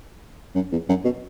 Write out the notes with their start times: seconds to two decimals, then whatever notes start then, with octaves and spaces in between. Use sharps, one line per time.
0.55 F#2
0.72 E2
0.89 F#2
1.04 B2